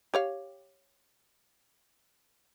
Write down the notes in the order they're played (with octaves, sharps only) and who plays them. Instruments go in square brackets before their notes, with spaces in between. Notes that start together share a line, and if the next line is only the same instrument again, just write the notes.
[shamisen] G4 C#5 F5